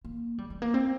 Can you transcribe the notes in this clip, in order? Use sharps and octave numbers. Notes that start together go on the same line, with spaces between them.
A#3
G3
G#3
A#3
C4